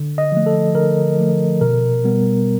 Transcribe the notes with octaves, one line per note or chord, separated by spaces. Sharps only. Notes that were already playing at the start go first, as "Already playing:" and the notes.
Already playing: D3
D#5
F3 A3
A4
D3 A#4
F3 A3
B2 A#4
G3 B3